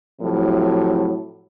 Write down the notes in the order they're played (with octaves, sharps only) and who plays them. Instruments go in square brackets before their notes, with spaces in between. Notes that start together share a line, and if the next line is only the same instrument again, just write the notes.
[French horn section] A2 C3 F3 F#3